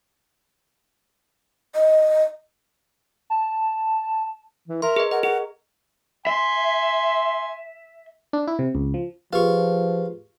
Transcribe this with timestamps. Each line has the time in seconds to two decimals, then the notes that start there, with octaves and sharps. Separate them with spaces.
1.75 D#5
3.30 A5
4.68 E3
4.82 A#4 E5 C6
4.96 G#4 B4 D#5
5.11 A#4 D#5 F#5
5.23 G#4 F#5
6.27 E5 G#5 C6
8.33 D4
8.47 E4
8.59 C3
8.75 C#2
8.94 F3
9.33 F3 F4 G4 G#4 B4 C#6